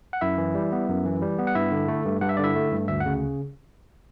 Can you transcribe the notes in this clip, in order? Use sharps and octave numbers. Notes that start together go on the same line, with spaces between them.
F#5
F#2 E4 E5
E3
G3
B3
F#2
E3
G3
B3
F#5
G2 E4 E5
D3
A3
G2
G2 F#5
E5
D3 D5
E4 E5
A3
G2
D2 E5
F#5
C#3